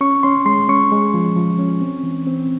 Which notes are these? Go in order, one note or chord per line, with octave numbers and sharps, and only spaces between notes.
C#4 C#6
C#4 C6
G#3 C6
C#4 C#6
G#3
F3
F3
C#4
C4
E3
C4